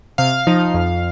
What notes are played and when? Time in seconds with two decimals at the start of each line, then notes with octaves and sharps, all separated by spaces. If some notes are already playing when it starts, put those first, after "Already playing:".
0.18 C3 F5
0.47 F3 D#4
0.74 F2